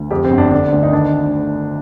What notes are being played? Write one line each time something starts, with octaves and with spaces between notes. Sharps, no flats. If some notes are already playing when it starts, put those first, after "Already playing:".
Already playing: D2
F2 G4
C4
G1
D4
D3 D4
D2
D#4
D#3 D4